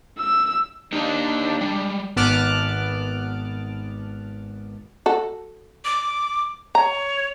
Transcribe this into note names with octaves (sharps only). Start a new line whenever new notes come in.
E6
A#3 D4 D#4 G4
G3 G#3
G#1 B3 A5 D6 F6 F#6
F#4 A4
D6
C#5 A#5